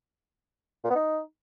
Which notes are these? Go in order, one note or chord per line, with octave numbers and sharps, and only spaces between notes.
A#2
B3
D#4